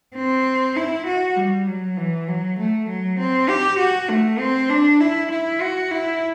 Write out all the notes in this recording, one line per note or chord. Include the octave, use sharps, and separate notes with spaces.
C4
E4
F#4
G3
F#3
E3
F#3
A3
F#3
C4
G4
F#4
A3
C4
D4
E4
E4
F#4
E4